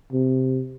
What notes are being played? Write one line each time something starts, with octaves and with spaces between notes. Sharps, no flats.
C3